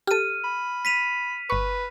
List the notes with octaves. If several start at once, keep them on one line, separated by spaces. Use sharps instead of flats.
G4 A4 F6 D#7
B5
B6 D#7 F7
G1 B4 C#6